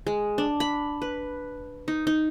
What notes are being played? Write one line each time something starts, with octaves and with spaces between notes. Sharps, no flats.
G#3
D4
B5
B4
D#4
D#4